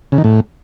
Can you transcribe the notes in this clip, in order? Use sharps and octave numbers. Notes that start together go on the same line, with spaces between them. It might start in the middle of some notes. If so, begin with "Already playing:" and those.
C#3
D#3
A2